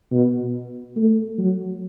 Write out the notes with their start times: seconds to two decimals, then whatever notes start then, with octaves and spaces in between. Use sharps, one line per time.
0.11 B2
0.96 A3
1.38 F#3